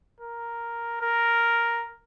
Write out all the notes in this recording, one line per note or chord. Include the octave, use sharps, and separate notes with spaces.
A#4
A#4